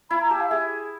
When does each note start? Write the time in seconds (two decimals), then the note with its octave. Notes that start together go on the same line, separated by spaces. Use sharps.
0.10 E4 B5
0.21 A#5
0.30 G4 A5
0.40 F5
0.49 G#4 E5